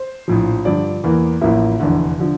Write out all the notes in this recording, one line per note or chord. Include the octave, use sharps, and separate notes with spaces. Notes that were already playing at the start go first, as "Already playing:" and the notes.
Already playing: C5
A#1 A2 F3
G2 D3 F3 D5
E2 E3 A#3
A1 A2 F3 A#3 E5
F1 E2 D3
D3 F3